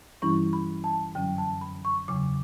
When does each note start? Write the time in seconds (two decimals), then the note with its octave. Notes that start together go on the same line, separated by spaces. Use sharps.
0.22 G2 E3 G3 C#4 E4 C#6
0.53 B5
0.84 A5
1.15 F#2 D3 F#3 C#4 G5
1.38 A5
1.61 B5
1.85 C#6
2.08 E2 C#3 F#3 D6